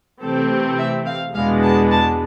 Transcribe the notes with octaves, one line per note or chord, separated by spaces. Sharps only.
C3 E3 A3 C4 A4
E5
F5
E2 B2 G#3 B3 D4 F5
A5
A5